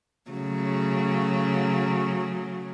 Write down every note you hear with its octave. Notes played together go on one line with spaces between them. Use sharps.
C#3 F#3 A3